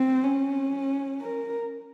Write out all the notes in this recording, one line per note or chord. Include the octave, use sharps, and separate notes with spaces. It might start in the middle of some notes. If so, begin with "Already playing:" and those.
Already playing: C4
C#4
A#4